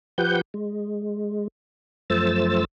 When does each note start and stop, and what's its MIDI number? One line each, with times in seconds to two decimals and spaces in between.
0.18 0.41 53
0.18 0.41 67
0.18 0.41 71
0.18 0.41 78
0.18 0.41 91
0.54 1.48 56
2.10 2.65 42
2.10 2.65 53
2.10 2.65 57
2.10 2.65 72
2.10 2.65 88
2.10 2.65 93